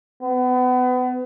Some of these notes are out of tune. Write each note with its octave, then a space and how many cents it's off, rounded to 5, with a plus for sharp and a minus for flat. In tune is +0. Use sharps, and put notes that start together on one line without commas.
B3 +30